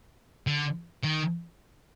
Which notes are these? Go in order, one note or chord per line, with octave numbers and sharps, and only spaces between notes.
D3
D#3